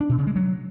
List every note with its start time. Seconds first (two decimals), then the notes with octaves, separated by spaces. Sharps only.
0.01 D4
0.09 B2
0.18 C#3
0.27 G#3
0.36 F#3